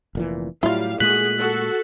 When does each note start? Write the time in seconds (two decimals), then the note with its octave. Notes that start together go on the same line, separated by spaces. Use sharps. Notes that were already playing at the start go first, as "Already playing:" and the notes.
0.15 F1 A#2 E3
0.63 A2 F#3 G3 E4 F4 F5
1.00 A#2 G#3 A3 F#4 G#4 F#6 B6 F#7
1.39 F#4 A4